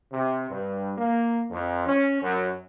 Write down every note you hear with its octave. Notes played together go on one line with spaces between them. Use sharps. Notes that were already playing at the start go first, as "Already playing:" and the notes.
C3
G2
A#3
F2
C#4
F#2